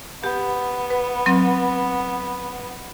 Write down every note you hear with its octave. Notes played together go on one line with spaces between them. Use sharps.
B3 G4
B4
F#3 C4